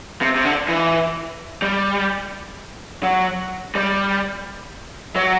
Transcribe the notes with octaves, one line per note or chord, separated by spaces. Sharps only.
C3
C3
D3
E3
G3
F#3
G3
F#3